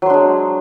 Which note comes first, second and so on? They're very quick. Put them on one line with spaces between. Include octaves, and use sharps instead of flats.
F#3 C5 D4 G#3